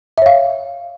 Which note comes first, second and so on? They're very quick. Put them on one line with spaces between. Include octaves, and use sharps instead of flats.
E5 C#5 F5